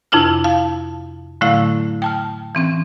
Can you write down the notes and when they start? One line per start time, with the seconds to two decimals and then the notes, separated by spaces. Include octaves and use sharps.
0.12 F2 C3 D4 E4 F4 F6
0.44 F5 A5
1.41 A2 D3 F#3 A3 E4 F5
2.02 G5 A5 F6
2.55 E3 C4 C#4